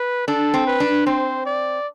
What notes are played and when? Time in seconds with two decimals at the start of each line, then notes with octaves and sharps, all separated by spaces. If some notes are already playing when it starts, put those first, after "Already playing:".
Already playing: B4
0.27 D4 A4
0.54 C4
0.67 B4
0.80 D4
1.06 C4 C5
1.46 D5